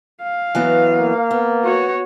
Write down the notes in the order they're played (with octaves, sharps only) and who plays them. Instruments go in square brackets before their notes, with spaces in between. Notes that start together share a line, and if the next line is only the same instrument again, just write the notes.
[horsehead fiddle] F5
[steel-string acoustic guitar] E3 F#3 B3
[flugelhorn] A#3
[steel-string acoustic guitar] B3
[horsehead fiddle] F#4 C#5